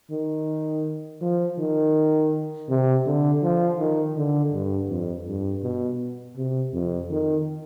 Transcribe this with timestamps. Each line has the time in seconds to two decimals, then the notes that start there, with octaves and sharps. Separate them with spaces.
0.11 D#3
1.21 F3
1.59 D#3
2.69 C3
3.06 D3
3.43 F3
3.79 D#3
4.16 D3
4.53 G2
4.89 F2
5.27 G2
5.63 B2
6.36 C3
6.73 F2
7.10 D#3